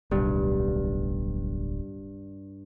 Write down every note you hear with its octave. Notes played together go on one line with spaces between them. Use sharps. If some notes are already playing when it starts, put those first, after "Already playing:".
D1 B1 G2